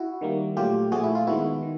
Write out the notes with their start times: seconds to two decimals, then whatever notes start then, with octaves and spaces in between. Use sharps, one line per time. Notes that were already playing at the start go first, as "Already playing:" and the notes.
Already playing: E4 F#4
0.21 D#3 G3 A#3
0.56 A#2 F#3 A3 F4 G4
0.92 A#2 F3 A3 F#4 G#4
1.03 E4
1.15 F4
1.27 D#3 G#3 B3 E4 F#4
1.62 D#3